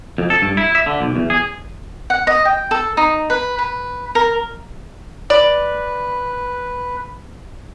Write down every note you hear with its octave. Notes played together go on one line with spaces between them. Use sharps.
F2
A4
G2
E4
E5
D3
B1
E2
G#4
F#5
D#5
G5
A4
D#4
B4
B4
A#4
B4 D5